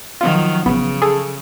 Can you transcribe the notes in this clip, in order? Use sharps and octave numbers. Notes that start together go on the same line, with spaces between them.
D#3 F3 F#3 F4
A1 C#3 B3
G#4 A4